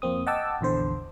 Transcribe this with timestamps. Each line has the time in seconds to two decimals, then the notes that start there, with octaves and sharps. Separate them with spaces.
0.02 F2 A#3 C4 D#6
0.26 D#5 F#5 G5 A5 D6 E6
0.61 A#1 E2 D3 C5